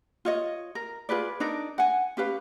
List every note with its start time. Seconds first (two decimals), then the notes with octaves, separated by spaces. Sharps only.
0.25 F4 C#5 D#5
0.75 A#4
1.09 F4 G#4 B4 D5
1.40 D4 D#4 A#4 D5
1.78 F#5 G#5
2.17 C#4 G4 B4 F5